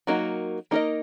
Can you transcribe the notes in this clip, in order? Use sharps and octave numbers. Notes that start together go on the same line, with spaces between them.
F#3 A#3 D#4 F#4
A#3 D#4 A#4 D#5